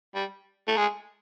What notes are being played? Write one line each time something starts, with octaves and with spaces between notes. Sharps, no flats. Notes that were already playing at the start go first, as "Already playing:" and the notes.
G3
A3
G#3